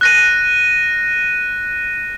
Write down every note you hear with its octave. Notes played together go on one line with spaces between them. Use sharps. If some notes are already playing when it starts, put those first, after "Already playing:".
F#6 A#6 D#7